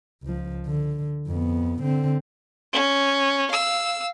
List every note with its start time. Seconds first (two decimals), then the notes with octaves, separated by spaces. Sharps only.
0.23 C#2 F3
0.66 D3
1.27 F2 B3
1.82 D3 C4
2.73 C#4
3.50 F5 E6